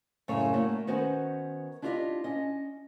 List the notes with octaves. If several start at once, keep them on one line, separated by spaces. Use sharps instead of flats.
F#2 A2 C#3 G#3 A4 C#5
A3 A#3 E4 F#4 C#5
D#3 B3 C#4 F#4 B4 C5
D4 E4 F4 G4 B4 D#5
C#4 D#5